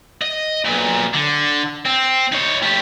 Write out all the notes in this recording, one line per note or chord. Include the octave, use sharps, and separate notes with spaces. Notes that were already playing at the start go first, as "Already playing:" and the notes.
D#5
B1 A#2
D3
C4
D#4 C#5
A3 G4